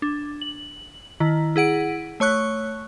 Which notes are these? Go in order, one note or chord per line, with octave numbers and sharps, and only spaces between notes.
D4
F#7
D#3 E4
E4 G#4 F#5 D7
A3 C#5 C#6 F#6